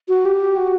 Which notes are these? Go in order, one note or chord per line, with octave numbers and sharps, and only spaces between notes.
F#4
G4
F#4